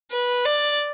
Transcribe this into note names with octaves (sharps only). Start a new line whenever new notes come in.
B4
D5